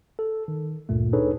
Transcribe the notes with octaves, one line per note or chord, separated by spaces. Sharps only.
A4
D#3
D2 G2 A#2 A3
D4 D#4 G#4 A4 B4 C#5